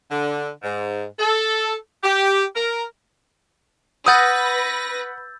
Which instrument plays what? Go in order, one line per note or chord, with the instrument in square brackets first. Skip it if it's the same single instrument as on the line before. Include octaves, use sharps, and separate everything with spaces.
[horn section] D3
G#2
A4
G4
A#4
[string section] B4 A#6 [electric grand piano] F#5 D#6 [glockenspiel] E6 G6 A6